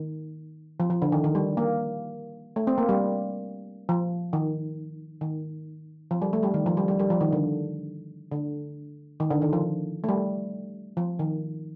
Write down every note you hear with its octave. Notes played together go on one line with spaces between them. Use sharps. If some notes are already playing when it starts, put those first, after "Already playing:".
Already playing: D#3
F3
F3
D3
D#3
D#3
G3
A#3
A3
C4
A#3
G3
F3
D#3
D#3
F3
G3
A3
G3
D#3
F3
G3
G3
G3
F3
D#3
D3
D3
D#3
D3
D#3
F3
A3
G3
F3
D#3